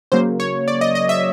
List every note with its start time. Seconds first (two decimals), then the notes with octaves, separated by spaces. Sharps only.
0.12 C#3 F#3 A#3 C5
0.40 C#5
0.68 D5
0.81 D#5
0.95 D#5
1.09 E5